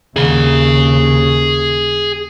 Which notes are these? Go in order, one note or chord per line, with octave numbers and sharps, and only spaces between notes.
D#2 C#3 G#4 B5